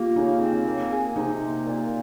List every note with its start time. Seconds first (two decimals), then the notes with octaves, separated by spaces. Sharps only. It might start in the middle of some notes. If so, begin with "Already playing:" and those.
Already playing: A#3 F4 G4
0.16 C#3 D#4
0.41 C4
0.66 A#3
0.91 G#4
1.16 C3 D#4
1.40 A#3
1.65 A#2